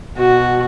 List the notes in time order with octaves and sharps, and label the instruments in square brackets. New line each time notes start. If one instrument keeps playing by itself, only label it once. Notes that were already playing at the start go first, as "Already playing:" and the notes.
[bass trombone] B2 [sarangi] F#4